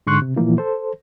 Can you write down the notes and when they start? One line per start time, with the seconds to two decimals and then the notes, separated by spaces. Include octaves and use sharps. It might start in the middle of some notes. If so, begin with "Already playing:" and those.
0.07 G#2 D3 C6 C#6 F#6
0.22 C3
0.36 A#2 E3 F3 A#3 E4
0.58 A4 C5